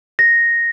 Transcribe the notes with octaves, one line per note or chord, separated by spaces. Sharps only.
A#6